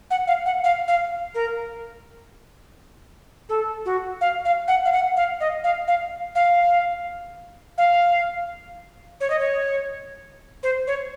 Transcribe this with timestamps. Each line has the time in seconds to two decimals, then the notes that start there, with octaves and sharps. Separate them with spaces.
0.10 F#5
0.27 F5
0.46 F#5
0.64 F5
0.88 F5
1.35 A#4
3.49 A4
3.85 F#4
4.21 F5
4.45 F5
4.68 F#5
4.85 F5
4.93 F#5
5.16 F5
5.40 D#5
5.64 F5
5.88 F5
6.35 F5
7.78 F5
9.20 C#5
9.30 D#5
9.39 C#5
10.63 C5
10.87 C#5